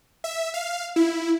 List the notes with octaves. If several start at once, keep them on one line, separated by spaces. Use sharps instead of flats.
E5
F5
E4